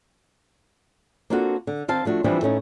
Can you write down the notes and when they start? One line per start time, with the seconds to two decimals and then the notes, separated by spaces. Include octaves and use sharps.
1.30 A#3 C4 D4 F4 F#4 A4
1.67 D3
1.88 D#3 C4 F5 A5
2.05 F3 A3 D4 F#4
2.24 E3 F3 G3 C4 D4 E4
2.41 A2 A3 C#4 D#4